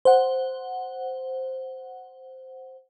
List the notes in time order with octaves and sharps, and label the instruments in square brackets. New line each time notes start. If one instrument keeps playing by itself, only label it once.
[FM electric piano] C5 F#5